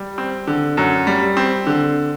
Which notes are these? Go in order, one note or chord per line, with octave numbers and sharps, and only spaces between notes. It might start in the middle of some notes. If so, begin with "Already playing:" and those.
Already playing: G3
C4
D3
F#2
G3
C4
D3